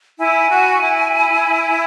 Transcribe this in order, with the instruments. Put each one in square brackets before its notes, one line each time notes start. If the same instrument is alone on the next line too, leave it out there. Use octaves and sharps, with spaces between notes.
[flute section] E4 [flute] G#5
[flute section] F#4
E4